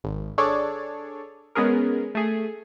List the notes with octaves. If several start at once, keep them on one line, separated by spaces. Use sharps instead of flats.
G#1
D4 G#4 A4 C#5 D5
G#3 B3 C#4 G#4 A#4
A3 G#4